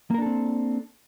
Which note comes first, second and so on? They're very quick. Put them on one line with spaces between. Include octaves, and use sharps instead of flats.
A#3 A#4 D4 A4 C4